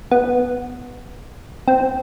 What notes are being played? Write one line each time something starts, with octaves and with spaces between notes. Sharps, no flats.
B3
C4